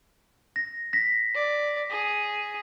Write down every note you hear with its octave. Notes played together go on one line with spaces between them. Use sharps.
A#6
A#6 B6
D5
G#4